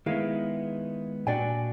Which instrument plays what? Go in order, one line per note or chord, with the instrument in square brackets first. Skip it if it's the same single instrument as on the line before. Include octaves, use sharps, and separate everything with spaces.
[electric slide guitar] D#3 G#3 B3 [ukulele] E4 A#4 F5
[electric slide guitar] A#2 D4 F#4 [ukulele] D5 G5 G#5